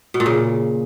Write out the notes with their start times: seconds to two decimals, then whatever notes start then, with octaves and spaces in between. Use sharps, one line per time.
0.14 B2
0.20 A#2
0.26 C#3